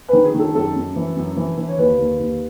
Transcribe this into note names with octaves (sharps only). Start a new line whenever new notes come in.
D#3 B4
G#4
D#3
A4
F#2 A4
F#2
E3
F#2
E3
E3
C#5
D#2 B4
D#2
D#2